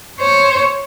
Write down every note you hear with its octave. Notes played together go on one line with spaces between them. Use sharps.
C5 C#5